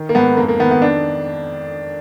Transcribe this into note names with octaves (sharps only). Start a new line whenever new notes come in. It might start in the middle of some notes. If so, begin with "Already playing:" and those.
Already playing: D#3
A#3
G#2 B3
F2 A#3
A#3
D#3 B3
B3
D4